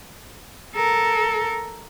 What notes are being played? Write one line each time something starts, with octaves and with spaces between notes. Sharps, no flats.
A4 A#4